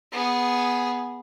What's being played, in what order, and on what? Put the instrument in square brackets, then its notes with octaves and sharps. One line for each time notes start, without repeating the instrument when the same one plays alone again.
[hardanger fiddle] B3 G#4